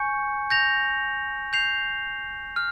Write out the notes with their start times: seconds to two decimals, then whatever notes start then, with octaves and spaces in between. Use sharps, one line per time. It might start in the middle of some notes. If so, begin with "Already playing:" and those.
Already playing: G#5 C#6 G6 C#7
0.50 G6 A#6 F7
1.53 G6 C7 F7
2.56 F6